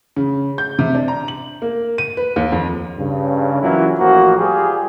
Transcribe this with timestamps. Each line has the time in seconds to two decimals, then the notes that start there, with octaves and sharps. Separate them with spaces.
0.16 C#3
0.58 G6
0.79 C3
0.95 D4
1.08 A#5
1.28 F#7
1.62 A#3
1.98 D#7
2.17 B4
2.36 D#2
2.52 F2
2.98 G2 C#3
3.62 E3 F#3 A#3 C#4 E4 F4
3.99 A1 F3 A#3 F#4
4.38 G3 F4 G4 G#4